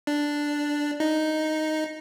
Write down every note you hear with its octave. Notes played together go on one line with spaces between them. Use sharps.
D4
D#4